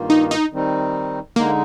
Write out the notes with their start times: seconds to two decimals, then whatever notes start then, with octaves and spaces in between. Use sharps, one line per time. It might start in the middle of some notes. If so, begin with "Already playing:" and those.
Already playing: G2 D#3 A#3 F4
0.10 D#4
0.31 D#4
0.52 D#3 G3 C4 D#4
1.36 D3 G#3 A#3 D#4